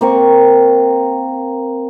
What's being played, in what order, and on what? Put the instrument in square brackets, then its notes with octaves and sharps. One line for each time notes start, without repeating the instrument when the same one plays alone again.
[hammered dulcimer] A#3 C4 C#6